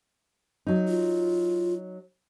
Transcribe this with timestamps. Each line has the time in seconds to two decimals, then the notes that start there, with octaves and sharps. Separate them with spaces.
0.67 F#3 D#4
0.88 F4